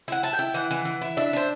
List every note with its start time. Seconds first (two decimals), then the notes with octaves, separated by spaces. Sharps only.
0.08 E4 F#5
0.23 E4 A5
0.33 G5
0.39 E4
0.54 E3 F#5
0.71 E3
0.85 E3
1.02 E4
1.17 D4 E5
1.33 D4 C5